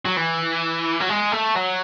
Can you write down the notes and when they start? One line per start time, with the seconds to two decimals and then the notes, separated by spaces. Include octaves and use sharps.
0.05 F#3
0.17 E3
1.01 F#3
1.10 G#3
1.33 A3
1.56 F#3